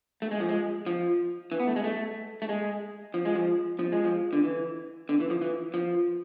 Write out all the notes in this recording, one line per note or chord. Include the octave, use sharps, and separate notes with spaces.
A3
G#3
F3
G#3
F3
E3
B3
A3
G#3
A3
A3
G#3
F3
G#3
F3
F3
G#3
F3
D3
E3
D3
E3
F3
E3
F3